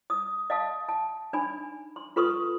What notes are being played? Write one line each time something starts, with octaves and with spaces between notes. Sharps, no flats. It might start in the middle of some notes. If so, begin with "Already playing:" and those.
D#6
D#5 F5 A5 D#6
A5
D4 D#4 G#5 B5
C6
F4 A4 B4 C6 C#6 D#6